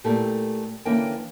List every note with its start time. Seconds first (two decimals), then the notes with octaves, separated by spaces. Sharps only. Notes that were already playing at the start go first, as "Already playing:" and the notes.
0.04 A#2 A3 E4 G4 A4
0.85 D3 E3 A#3 C#4 E4 G5